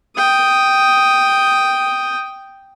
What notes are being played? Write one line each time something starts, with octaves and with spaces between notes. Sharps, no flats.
G5 D#6